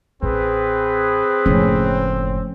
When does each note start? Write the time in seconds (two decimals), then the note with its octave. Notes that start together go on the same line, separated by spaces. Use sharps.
0.23 A1 C4 G#4 B4
1.46 F#1 A2 F3 A3 C#4